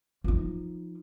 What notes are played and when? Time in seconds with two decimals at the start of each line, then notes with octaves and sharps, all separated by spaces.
0.24 F3 D#4